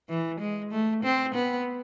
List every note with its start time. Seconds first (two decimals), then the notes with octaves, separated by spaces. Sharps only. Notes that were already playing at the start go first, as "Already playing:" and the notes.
0.09 E3
0.40 G#3
0.71 A3
1.04 C4
1.35 B3